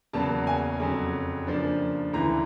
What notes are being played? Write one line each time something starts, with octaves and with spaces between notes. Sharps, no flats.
E2 C#3 F#3 A#3 A5
G#5
F2 C#3 F#3
C#3 F3 A#3 D4
D2 C#3 E3 A#5